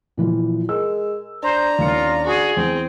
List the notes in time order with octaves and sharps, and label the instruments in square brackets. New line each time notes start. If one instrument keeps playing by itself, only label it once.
[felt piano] A#2 E3 F3
[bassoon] G#3 [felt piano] A#4 E6
[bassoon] D4 [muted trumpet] C5 [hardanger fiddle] A#5
[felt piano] D#2 C#4 C#7 [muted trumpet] F4
[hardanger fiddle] F#4 [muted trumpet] G#4
[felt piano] E2 [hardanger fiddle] C4